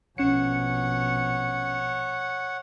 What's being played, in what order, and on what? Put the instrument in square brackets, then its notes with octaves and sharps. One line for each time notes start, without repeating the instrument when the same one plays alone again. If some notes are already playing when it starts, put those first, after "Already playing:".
[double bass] A#1 B2 [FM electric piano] C#4 C#7 [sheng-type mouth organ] C#5 F#5